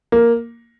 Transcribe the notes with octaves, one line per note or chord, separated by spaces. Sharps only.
A#3